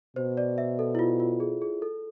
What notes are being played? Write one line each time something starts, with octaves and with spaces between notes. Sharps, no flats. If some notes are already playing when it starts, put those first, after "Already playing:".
B2 C5
D5
E5
A4
E4
F4
F4
G#4
G#4
A4